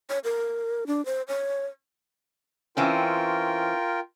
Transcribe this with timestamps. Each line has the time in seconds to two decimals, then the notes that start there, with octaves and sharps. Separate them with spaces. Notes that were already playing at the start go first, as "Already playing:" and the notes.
0.10 C#5
0.24 A#4
0.87 D4
1.06 C5
1.28 C#5
2.77 E3 C4 C#4 F4 A#4 G5